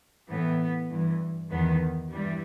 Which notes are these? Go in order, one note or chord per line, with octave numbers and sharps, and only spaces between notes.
A2 E3 B3
G2 E3
E2 D#3 B3
G2 E3 G3